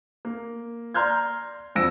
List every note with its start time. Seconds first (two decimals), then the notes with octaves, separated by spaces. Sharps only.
0.25 A#3
0.94 D5 A#5 C6 F6 G6 G#6
1.75 E1 F2 C5 E6 A#6 D7